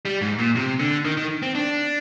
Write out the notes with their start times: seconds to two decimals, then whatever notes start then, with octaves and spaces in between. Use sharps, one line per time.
0.05 G3
0.22 G#2
0.39 A#2
0.56 C3
0.80 D3
1.05 D#3
1.17 D#3
1.42 C4
1.55 D4